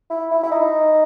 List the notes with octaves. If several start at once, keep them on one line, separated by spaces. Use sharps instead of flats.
E4
E4
E4
D#4